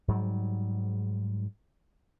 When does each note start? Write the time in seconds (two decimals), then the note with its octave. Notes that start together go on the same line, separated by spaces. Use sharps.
0.08 G#2 F#3 G3